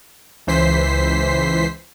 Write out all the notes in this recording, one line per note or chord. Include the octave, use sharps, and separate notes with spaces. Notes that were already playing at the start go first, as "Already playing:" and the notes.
C#2 E3 C5 B6 C7